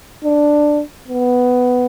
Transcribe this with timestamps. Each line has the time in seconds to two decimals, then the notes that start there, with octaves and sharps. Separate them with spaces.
0.24 D4
1.08 B3